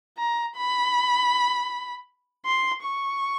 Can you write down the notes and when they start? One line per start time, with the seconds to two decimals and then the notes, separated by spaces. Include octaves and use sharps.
0.18 A#5
0.56 B5
2.46 C6
2.84 C#6